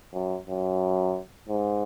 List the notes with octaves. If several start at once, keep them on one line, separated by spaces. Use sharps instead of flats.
F#2
F#2
G#2